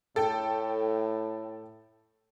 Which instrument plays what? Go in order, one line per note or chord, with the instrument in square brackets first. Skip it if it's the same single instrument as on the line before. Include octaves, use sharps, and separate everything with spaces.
[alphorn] A2 [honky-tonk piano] A4 G5